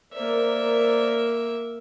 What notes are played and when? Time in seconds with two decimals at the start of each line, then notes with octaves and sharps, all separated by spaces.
0.13 A#3 A#4 C5 D5 E5